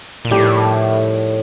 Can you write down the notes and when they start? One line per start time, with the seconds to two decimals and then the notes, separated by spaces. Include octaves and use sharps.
0.25 A#2
0.30 F2 A2 D#3 G3 D4 G4